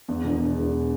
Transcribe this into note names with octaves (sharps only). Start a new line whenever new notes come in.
E2
E1
E1
E1